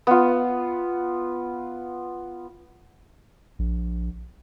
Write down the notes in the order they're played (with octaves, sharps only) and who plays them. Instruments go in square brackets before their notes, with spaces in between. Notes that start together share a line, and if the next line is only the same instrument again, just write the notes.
[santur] B3 F4
[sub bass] A#1